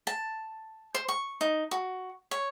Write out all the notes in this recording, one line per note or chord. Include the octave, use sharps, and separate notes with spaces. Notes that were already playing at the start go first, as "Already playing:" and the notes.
A5
C5
C#6
D#4
F#4
C#5